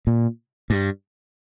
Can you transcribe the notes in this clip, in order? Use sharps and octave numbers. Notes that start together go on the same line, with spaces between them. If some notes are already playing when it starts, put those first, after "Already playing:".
A#2
G2